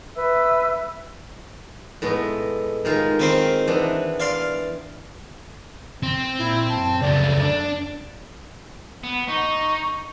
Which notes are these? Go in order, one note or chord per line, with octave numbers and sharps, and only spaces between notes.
B4 E5 E6
A2 G#3 B3
D#3 G#3 F4
D#3 C4 B5 C6
E3 B3 D4
D5 F5 C6
C4
A#2 E4
F#2 A5
C#2 A3 D5
D4
B3
D#4 C#6